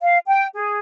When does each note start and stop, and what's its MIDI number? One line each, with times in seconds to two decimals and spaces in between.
0.01 0.17 77
0.27 0.47 79
0.54 0.79 68